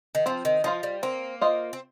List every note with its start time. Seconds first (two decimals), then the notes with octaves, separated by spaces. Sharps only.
0.15 D#3
0.26 F3 C4
0.45 D#3
0.64 F3 F4 C5 D#5
0.83 G3
1.03 A#3 C4
1.41 F4 C5 D#5
1.73 C4